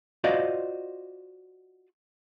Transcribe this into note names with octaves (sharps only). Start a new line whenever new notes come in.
F4 F#4 C5 D5 D#5 F5